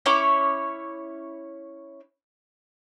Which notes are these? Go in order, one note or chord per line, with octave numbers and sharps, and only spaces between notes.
C#4 E4 C#5 D6